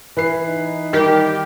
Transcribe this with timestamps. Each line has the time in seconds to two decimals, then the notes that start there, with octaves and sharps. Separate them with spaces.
0.17 E3 B4 C7
0.46 D#4
0.93 D#3 G3 G4 A#4